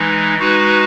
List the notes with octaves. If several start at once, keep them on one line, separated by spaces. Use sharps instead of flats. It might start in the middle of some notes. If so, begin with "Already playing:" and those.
Already playing: E3 G#3 D#4
G#3 D#4 F#4 B4